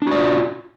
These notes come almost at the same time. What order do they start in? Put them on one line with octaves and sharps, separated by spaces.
D4 F#4 D5 F4